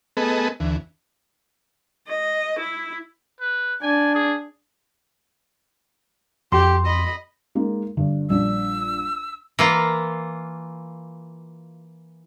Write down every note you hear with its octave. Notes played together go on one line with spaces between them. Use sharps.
A3 B3 G#4 A4 B4 D#5
D2 E3
D#5
E4
B4
D4 G#5
G#4
F2 G4 C6
D#5 B5
G#3 A#3 D#4
G2 D3
A#1 G3 D4 D5 E6
E3 A#3 F4